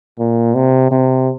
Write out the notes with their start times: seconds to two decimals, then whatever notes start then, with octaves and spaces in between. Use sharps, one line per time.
0.19 A#2
0.55 C3
0.91 C3